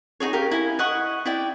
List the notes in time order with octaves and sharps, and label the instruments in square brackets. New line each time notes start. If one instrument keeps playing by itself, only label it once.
[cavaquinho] D#4 E4 G#4 C#5
G4 A#4 F5
E4 G#5
D#5 F#5 C#6
E4 D5 G5